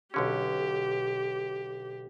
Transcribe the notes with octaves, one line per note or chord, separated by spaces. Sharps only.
B1 D3 C#4 G4